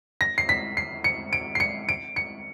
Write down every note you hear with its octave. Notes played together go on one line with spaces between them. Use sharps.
A#6
C7
B6
C7
C#7
D7
C7
C#7
D7
C#7